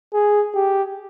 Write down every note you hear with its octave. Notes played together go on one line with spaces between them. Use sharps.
G#4
G4